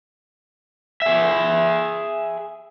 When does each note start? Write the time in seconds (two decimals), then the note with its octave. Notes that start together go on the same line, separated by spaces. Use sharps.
1.02 G#4 E5